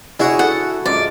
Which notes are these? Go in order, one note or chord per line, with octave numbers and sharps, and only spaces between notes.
D4 E4 F#4 G#4 C#5
A4 F#5
F#2 G#3 F4 D5